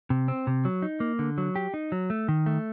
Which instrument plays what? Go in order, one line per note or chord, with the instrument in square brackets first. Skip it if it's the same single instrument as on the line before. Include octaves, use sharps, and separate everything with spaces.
[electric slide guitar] C3
C4
C3
F#3
D#4
A#3
D3
F#3
G4
D#4
F#3
A3
D#3
A3